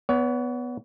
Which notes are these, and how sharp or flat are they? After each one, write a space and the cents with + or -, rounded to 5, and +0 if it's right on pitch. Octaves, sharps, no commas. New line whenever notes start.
B3 +0 C#5 +35